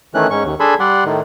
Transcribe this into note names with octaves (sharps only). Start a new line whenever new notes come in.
D#3 E3 A3 C#4 F#6
G#2 C#4 C#6
D#2
D4 G#4 A4 G#5 B5 C6
G3 D5 F#5 C6
A2 D#3